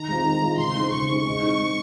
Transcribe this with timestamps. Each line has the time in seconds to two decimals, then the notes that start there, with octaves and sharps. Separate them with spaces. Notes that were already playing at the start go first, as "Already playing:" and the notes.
Already playing: D#3 A#5
0.08 G#3 C4 F4
0.25 D#3
0.42 G#3 C4 F4
0.58 C#3 C6
0.75 G#3 D#4 G#4 C5
0.92 C#3 C#6
1.09 G#3 D#4 G#4 C5
1.25 G#3
1.42 C4 D#4
1.58 G#3